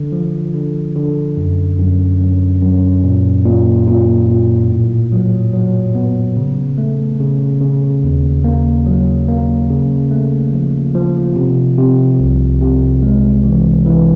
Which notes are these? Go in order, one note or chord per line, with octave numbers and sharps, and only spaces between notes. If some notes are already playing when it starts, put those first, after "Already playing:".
Already playing: D3
F3
D3
D3
F#2
F#2
F#2
F#2
A#2
A#2
A#2
A#2
A2
F#3
F#3
B3
C#3
A3
C#3
C#3
D#2
A#3
F#3
A#3
C#3
A3
F3
F3
C3
C3
C2
C3
G#3
E3
E3